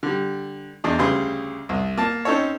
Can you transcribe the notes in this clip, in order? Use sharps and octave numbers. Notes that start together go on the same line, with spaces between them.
D3 G3
E2 G#3 D4 D#5
D2 C#3 G3 G#4 B4 C6
C2
A#3 A5
C4 C#4 D#4 A4 C#5